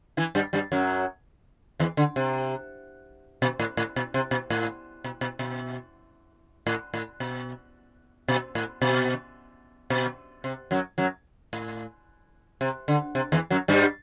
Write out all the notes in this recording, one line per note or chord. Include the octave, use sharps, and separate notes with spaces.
E3 E4
G2 G3
G2 G3
F#2 F#3
E2 E3
D3
C3
B2
A2
A2
B2
C3
B2
A2
B2
B2
B2
A2
A2
B2
B2
A2
B2
B2
C3
F#2 F#3
F#2 F#3
A2
C3
D3
C3
E2 E3
F#2 F#3
G2 G3